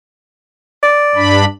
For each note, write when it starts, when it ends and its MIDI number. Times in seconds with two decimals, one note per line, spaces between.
0.83 1.37 74
1.15 1.45 43
1.15 1.45 62
1.15 1.45 83